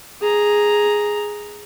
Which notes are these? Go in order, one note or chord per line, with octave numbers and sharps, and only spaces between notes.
G#4 A#5